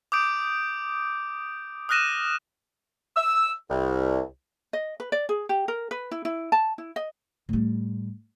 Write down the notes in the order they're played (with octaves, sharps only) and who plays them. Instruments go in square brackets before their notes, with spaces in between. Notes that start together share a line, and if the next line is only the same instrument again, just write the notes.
[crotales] D6 D#6 G6 D7
D#6 F6 F#6 A#6 D#7 E7
[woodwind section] E6
C2
[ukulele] D#5
B4
D5
G#4
G4
A#4
B4
E4
E4
A5
E4
D#5
[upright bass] A2 G3